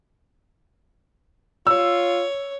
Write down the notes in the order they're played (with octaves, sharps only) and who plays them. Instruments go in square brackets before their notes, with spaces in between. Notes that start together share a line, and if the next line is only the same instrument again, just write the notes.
[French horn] F4 [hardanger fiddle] C#5 [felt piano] E6